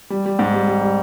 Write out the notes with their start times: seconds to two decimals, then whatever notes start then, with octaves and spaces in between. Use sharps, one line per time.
0.10 G3
0.26 G3
0.39 G#2
0.54 G3
0.68 G3
0.81 G3